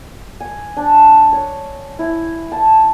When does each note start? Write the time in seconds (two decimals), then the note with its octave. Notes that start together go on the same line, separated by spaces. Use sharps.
0.40 G#5
0.77 D4
1.33 C#5
1.99 E4
2.52 A5